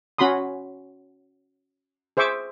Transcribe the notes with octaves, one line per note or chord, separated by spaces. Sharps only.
C#4 F#4 B5 C6 D#6
G#4 C5 E5 C#6 D6